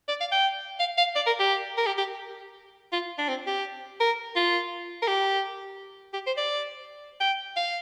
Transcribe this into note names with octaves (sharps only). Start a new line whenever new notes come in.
D5
F5
G5
F5
F5
D5
A#4
G4
A#4
G4
G4
F4
D4
C4
G4
A#4
F4
A#4
G4
G4
C5
D5
G5
F5